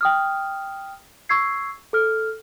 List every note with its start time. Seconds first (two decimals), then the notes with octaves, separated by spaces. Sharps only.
0.01 G5 D#6 F6
1.29 C#6 E6 G#6 C7
1.93 A4 F6